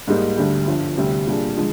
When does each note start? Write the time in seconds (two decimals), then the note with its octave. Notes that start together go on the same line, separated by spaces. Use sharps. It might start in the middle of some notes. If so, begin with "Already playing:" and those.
0.07 G#2 G3 A#3 D#4
0.37 D2 D3 G3
0.67 G1 G2 F3
0.97 D2 C3 G3 C4
1.27 A#2 G3 D4 G#4
1.57 D3 F3 G#3